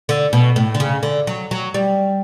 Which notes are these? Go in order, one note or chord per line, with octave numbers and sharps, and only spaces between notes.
D3
B2
A2
D3
C#3
D3
F#3
F#3
G3